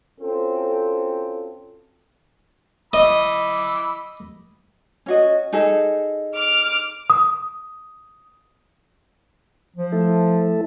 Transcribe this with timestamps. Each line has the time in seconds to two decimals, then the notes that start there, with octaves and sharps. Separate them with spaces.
0.21 C4 C#4 F4 F#4 A4
2.93 D#5 B5 D6 E6
5.06 C#4 F#4 D#5
5.53 D#4 G#4 A4
6.35 D6 F6
7.10 D#6
9.76 F3
9.92 A3 E4 A4